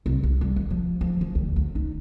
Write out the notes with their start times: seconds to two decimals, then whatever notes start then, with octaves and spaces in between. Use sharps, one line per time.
0.06 C2
0.23 C2
0.41 G3
0.56 D#3
0.70 F3
1.01 F3
1.21 F3
1.35 D2
1.56 D2
1.75 D#4